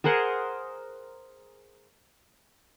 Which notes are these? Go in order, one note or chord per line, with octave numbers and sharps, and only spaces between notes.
G#4 A#4 C5 F#5